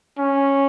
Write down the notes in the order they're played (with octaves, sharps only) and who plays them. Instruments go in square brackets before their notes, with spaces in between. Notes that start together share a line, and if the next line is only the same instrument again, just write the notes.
[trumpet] C#4